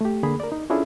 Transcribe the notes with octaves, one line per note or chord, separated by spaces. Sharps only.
A3 G4
D3 A#3 G#4 B5
A#4 D5
D#4
C#4 D4 E4 F4 G#4 A4